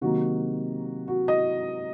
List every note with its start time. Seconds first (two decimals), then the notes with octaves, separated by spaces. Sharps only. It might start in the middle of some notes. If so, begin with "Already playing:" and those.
0.01 C3 D#3 F#3 A#3 F#4
1.08 F#4
1.28 D#5